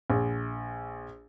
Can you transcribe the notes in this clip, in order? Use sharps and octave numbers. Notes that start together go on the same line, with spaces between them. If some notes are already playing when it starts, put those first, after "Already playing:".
A#1